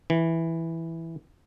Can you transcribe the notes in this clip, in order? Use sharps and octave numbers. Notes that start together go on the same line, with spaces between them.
E3